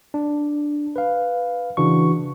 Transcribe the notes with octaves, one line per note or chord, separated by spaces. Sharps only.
D4
B4 F5
C#3 E3 D4 F#4 C#6